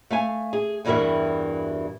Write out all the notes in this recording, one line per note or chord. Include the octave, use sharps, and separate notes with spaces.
A3 F5 G#5
G#4
E2 G2 E3 F#4 A#4 E5